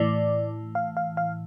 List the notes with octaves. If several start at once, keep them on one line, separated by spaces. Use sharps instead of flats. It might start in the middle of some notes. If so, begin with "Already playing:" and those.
Already playing: A2 E3 D5
F5
F5
F5